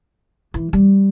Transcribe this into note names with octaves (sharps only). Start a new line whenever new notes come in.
E3
G3